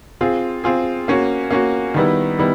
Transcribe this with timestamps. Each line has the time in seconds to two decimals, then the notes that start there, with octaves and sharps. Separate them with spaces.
0.21 C4 F4 G#4
0.64 C4 F4 G#4
1.08 A#3 C#4 F#4
1.51 A#3 C#4 F#4
1.94 D#3 G3 B3 E4
2.38 D#3 G3 B3 E4